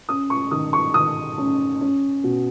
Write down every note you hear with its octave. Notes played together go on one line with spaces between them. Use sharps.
C#4 D#6
C#6
D#3 D#6
C#6
D#3 D#6
C#4
C#4
B2